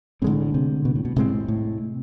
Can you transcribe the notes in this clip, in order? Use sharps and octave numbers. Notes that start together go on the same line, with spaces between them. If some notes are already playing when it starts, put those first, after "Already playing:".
A2 D3 G#3 C4
C3
B2
A2
B2
A2 C3 G#3 C4
A2